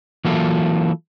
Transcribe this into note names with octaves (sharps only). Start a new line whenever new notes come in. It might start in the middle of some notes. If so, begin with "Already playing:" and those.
E3 F#3 A#3 E4 F4 A4